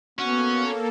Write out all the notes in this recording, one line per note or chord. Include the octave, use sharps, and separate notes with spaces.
A#3 B3 C#4 F#4 A4